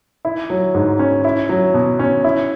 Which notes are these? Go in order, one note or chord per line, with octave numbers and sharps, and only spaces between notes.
E4
F#3
G#2
C#4
E4
F#3
B2
C#4
E4